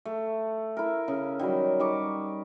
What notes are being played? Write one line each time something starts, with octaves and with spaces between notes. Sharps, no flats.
A3
E4 A#4
C#3
D#3 F#3 G3
G3 D#4 C#6 D6